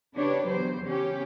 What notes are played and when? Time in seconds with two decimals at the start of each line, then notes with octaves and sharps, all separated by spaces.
0.15 C#3 D4 G4 B4 C#5
0.47 E2 F#3 C5
0.83 C#3 C#4 G4